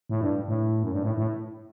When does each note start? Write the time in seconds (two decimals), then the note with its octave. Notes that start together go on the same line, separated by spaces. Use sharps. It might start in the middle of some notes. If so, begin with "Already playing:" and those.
0.09 A2
0.21 G2
0.48 A2
0.83 F#2
0.92 G2
1.03 A2
1.17 A2